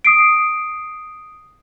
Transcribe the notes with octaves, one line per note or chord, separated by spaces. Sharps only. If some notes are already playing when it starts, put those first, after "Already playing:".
D#6 C7 D7